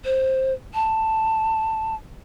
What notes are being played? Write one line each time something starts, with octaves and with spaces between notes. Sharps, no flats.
C5
A5